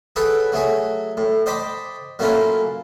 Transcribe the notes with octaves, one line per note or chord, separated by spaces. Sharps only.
G#4 A4 B4 C#5 F#5 G5
F#3 A3 G#4 C#5
A2
C5 D#5 G5 A5 B5 D6
F#3 A3 A#3 C#4 E4 F4